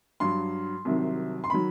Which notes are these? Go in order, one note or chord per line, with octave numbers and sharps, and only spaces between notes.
G2 F#3 C6
C2 C3 D#3 F#3
C6
D#3 F#3 B5